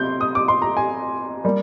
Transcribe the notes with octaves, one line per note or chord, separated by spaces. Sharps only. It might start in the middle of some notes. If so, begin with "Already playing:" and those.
Already playing: C3 C4 C6 G6
D#6
D6
C6
A#5
G#5
G3 A#3